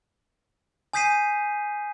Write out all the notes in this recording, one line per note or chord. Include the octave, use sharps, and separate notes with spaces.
G#5 D#6 G6 B6 C7 D#7